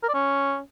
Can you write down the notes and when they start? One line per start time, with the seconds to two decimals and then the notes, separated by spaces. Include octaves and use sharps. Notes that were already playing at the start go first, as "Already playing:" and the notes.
0.03 A#4
0.08 D5
0.14 C#4